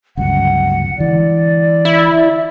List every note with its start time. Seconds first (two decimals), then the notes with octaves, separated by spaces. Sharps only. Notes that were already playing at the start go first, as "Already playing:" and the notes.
0.17 G1 C#2 F#2 F#5
0.98 D3 E3 G#3 D5
1.85 E4